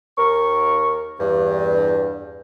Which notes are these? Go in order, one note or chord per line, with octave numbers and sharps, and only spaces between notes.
D#2 A#4 C#6
E2 G2